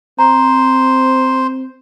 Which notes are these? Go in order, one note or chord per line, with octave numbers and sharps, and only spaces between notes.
C4 C5 A#5